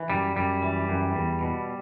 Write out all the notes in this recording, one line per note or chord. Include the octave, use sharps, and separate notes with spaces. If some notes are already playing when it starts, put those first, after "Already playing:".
Already playing: E3
F#2 G3
F#2 G3
E3
F#2
E2
B2